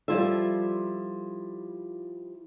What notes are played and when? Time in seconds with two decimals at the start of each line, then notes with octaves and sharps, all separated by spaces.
0.08 F3 G3 E4 F4 A4 E5